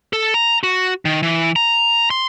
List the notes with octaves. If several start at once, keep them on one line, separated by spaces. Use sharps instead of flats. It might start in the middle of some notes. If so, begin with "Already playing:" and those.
A4
A#5
F#4
D#3
E3
A#5
C6